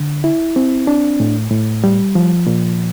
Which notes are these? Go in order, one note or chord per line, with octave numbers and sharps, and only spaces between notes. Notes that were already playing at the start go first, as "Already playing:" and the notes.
Already playing: D3
E4
C4
D4
A2
A2
G3
F3
A#2